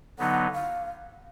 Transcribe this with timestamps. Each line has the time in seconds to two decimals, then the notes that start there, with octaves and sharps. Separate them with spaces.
0.19 D3 F#3 B3 D#4 F#5
0.53 F5